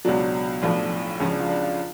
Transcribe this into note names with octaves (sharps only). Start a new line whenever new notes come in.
C#2 B2 F#3 D4
B1 A2 F3 D4
C#2 C#3 F3 C#4
D4
F4
D4
F4